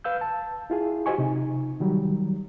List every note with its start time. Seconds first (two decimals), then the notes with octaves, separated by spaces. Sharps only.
0.04 B4 F5 E6 G6
0.21 A5
0.70 E4 F4 G#4
1.06 F#4 G4 C5 D#5 G#5 C#6
1.18 C3 D#4
1.80 D#3 F#3 G3